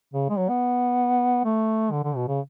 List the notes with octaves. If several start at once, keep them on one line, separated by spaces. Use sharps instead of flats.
C#3
G#3
F#3
B3
A3
D3
D3
B2
C#3